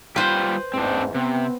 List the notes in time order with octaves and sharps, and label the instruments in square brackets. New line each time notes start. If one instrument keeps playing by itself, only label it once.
[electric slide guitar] G3 F4 G4 [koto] B4 C5
[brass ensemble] A1 E2 G#2 [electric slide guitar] C4 D4
[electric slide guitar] C3 [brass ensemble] B3 C4